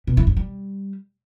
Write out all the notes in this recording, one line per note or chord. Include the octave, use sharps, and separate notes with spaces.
B2
E3
G2
G3